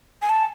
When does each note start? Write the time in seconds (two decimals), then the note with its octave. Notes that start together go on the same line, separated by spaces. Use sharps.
0.22 G#5
0.29 A5